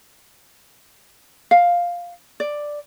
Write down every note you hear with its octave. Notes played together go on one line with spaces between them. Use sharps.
F5
D5